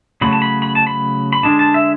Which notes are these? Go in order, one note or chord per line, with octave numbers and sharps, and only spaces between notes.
C#3 F#3 A3 B5
A5
B5
B5
A5
B5
B5
D3 G#3 D4 A5
A5
E5